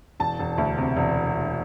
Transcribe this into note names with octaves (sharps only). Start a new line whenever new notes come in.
E1 A5
E1
D2
C3
E1